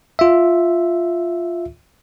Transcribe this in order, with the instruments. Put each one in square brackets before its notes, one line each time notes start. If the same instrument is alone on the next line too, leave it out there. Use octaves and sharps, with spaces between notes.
[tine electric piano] F4 E5